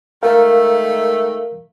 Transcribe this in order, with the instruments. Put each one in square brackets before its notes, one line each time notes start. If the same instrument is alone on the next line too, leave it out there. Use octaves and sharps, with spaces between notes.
[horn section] D#3 G#3 A3 [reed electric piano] A#4 F5